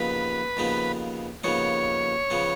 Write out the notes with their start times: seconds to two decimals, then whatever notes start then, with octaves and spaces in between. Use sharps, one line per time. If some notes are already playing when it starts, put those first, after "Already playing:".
Already playing: D#2 C#3 F3 B3 B4
0.57 D#2 C#3 F3 B3
1.44 D#2 C#3 F3 B3 C#5
2.30 C#3 F3 B3